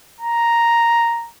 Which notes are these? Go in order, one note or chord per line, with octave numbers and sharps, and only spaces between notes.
A#5